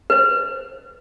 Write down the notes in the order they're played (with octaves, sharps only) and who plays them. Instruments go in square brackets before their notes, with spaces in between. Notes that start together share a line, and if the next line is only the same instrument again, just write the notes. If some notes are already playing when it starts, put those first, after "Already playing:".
[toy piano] B4 C5